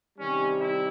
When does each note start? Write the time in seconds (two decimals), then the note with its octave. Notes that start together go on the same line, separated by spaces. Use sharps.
0.19 C3 D#3 G3 C#4
0.60 E4